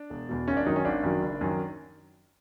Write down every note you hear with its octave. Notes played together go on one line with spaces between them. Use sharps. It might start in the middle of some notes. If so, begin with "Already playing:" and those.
Already playing: D4
E1
E2 B2
G#1 C#4
D4
F#2 D#3 F#3 D#4
C#4
G#1 D4
F#2 D#3 F#3
F#1
F#2 D#3 F#3